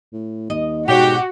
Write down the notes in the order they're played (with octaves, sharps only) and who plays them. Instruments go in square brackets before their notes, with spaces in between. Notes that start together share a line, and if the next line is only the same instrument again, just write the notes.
[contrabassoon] A2
[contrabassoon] D#2 [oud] D#5
[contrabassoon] G#2 [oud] B2 C#5 [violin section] F#4 [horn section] G4